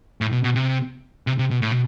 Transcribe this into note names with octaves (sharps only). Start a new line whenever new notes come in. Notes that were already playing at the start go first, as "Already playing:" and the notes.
A2
B2
B2
C3
C3
C3
B2
A2
B2